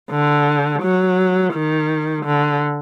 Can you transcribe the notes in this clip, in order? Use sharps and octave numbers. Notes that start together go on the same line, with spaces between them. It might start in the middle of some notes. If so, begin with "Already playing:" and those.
D3
F#3
D#3
D3